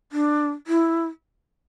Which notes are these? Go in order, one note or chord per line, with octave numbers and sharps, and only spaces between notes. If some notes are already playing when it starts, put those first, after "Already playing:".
D4
E4